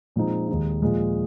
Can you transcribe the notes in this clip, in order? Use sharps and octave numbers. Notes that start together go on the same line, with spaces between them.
A#2 F3 G#3 C4 D#4
D#2 D#3 G#3 D#4
A#2 F3 G#3